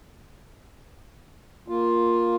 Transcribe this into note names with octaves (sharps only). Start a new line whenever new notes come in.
A#3 F4